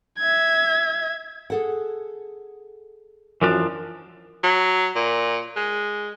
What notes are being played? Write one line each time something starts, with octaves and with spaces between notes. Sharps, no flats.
E5 G#6
G#4 A4 F#5
F#2 E3 F3 D4
F#3
A#2
G#3